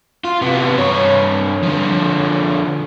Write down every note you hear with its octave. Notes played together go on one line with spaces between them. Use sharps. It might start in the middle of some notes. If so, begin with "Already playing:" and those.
F4
C3 B3
G2 C#5
D3 F3